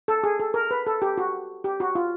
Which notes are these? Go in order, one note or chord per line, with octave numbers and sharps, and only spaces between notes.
A4
G#4
A4
A#4
B4
A4
G4
F#4
G4
F#4
F4